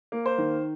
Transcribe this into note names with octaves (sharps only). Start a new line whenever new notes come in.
A#3
C5
D#3